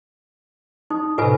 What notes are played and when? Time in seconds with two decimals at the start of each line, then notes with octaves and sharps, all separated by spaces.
0.90 D#4 D#6
1.18 A2 C3 F4 B4 G#5